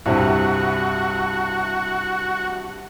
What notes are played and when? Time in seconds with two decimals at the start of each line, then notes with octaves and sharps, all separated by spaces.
0.06 C2 G2 C3 F#4